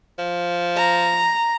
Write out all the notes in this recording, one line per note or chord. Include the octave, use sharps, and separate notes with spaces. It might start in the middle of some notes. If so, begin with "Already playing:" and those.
F3
A#5